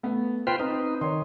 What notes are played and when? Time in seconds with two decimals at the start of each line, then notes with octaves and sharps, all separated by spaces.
0.03 A3 B3
0.47 F4 B4 C5 G5
0.60 C4 D#4 B4
1.01 D#3 C#5 C6